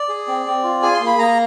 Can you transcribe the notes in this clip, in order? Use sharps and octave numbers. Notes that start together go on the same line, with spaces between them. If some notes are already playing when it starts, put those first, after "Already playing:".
Already playing: D5
G#4
C4
C4
F4
G#4 G#5
C6
A#3
B5
A#3 A#5